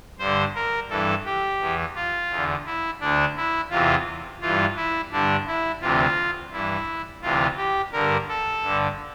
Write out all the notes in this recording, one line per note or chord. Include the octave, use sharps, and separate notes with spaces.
G2 D3 C5
A#4
G2 E3 A4
G4
E2 E3
F4
E2 D3
E4
D2 D3 D4
E4
E2 C3 E3 F4
G2 E3 F4
E4
G2 D3 D4
E4
D2 C3 E3 F4
G2 E3 E4
D2 C3 E3 F4
G4
G2 D3 A#4
A4
G2 D3